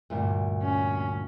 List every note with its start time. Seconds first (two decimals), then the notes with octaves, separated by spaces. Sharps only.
0.10 D2 G2 A#2
0.63 C#4